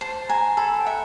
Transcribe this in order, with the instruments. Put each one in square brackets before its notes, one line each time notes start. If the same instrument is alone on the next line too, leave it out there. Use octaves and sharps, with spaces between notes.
[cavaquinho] C5 [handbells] A5
[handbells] A5
[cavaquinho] G#5 [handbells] A#5
[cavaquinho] A4 [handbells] B5
[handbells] G5
[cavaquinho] E5 [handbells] F#5